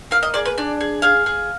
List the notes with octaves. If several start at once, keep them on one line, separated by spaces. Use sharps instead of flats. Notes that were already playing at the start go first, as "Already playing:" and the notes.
A#3 F5
D#5
G#4 D5
B4
D4 D5
G#4
G#4 F5
G#4